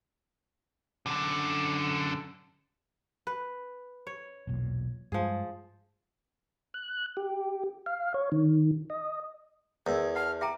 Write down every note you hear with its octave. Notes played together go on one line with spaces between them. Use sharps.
F#2 D3
B4
C#5
E1 B1 A#2
G2 F3 G#3 G#4
F#6
G4
F5
C#5
D#3
D#5
E2 G#4 A#4 E6
D5 F#5 A5 F6
E5 G5 A#5 D6